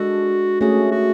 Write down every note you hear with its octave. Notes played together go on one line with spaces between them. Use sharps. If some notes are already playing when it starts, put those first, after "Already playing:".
Already playing: G#3 D4 F#4 A4
A3 C#4 F#4 G#4
F#4